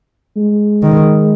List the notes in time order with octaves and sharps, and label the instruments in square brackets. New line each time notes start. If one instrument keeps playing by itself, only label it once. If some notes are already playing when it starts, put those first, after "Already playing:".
[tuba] G#3
[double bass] D#3